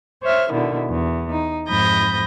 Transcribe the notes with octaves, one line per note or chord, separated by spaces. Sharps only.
C5 C#5 E5 F6
B2 D3 D#3 E4
E2
D#4
F2 G#2 B5 D#6 G6 A#6